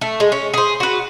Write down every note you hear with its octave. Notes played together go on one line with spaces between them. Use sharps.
A3
G#3
C#4
G#4 C5
F#4 B4